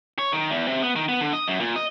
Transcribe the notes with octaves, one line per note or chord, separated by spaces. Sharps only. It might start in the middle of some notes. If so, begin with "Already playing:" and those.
C#5
D#3
E2
C3
B3
D#3
B3
D3
D#5
F#2
A#2
D#5